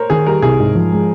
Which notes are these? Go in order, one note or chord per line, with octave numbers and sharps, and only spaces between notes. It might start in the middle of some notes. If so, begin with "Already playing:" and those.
Already playing: A#4 C5 C#5
D#3 G#4
G3 A#4
C2 G#4
G#2
F3
G#3